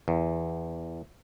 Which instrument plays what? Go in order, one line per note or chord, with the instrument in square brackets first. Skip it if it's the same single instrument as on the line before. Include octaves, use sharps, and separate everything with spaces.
[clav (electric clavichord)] E2